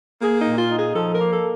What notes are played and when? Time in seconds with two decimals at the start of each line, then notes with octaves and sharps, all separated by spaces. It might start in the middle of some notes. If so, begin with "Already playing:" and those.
0.22 A#3 G#4
0.41 D#4
0.46 A#2
0.58 F4
0.70 D#4
0.78 G#4
0.95 F3 A4
1.13 A#4
1.20 A#3
1.31 A4